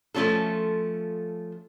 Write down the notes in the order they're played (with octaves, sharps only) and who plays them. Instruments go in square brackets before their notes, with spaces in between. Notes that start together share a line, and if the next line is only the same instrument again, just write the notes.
[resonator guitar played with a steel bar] F3 A3 C#4 F4 A4